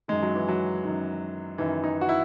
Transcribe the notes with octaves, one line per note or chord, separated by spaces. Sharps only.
F#2 D#3 G#3
F#3
E3
F#3
F#2 D#3
F#2 D#3 E3
D#4
F#4
E4